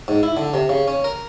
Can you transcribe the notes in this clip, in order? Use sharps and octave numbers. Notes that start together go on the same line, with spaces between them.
G#2
E4
D3
C3
C#3
C#4
A#4